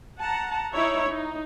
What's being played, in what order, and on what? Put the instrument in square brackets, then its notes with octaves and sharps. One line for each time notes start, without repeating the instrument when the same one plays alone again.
[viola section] F#5 A5 A#5
D#4 E4 C#5 E5
D#4